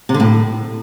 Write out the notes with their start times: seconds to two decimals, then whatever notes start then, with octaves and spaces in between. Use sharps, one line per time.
0.09 C3
0.14 D3
0.20 A2